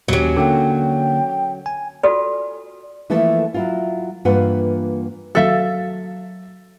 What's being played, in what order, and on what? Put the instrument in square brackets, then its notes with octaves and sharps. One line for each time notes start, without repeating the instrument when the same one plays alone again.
[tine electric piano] D#2 G4 [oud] F#3 C#4
[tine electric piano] D3 A#3 [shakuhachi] G5
[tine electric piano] G#5
[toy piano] F4 F#4 A4 D5
[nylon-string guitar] E3 F3 A3 A#3 E4 A4
F#3 E4 F4
G2 E3 A#3 F4 B4 F#5
[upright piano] F#3 A6 [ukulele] A4 E5 F5